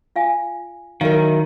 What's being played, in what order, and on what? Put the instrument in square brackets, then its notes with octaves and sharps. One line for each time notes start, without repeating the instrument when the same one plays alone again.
[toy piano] F4 F5 G#5
[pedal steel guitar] D#3 [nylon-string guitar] F#3 E4 A#4 [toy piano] B4 D#5 F5